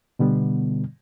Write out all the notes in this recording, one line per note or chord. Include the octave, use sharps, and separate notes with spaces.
B2 D3 G3 B3